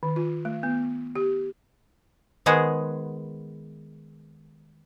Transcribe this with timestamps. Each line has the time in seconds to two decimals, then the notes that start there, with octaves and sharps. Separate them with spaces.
0.03 D#3
0.16 F4
0.45 A3
0.63 B3
1.16 G4
2.46 D#3 G#3 B3 G#4 C5